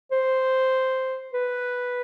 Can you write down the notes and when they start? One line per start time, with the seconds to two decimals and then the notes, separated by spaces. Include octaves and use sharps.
0.12 C5
1.34 B4